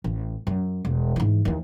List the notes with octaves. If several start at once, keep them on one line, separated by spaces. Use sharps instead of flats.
A1
F#2
E1
G#2 E3
D#2 E3